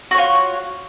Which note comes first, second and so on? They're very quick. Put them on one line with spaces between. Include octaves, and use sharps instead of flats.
F#4 C#5 F4